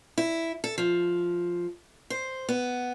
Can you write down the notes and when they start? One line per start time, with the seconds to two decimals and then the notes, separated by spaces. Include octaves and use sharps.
0.18 E4
0.64 A4
0.78 F3
2.10 C5
2.49 B3